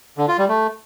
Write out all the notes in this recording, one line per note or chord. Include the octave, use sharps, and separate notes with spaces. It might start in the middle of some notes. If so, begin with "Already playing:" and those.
D3
F4
G3
A3